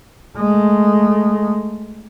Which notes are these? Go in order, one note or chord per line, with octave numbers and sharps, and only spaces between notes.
G#3 A3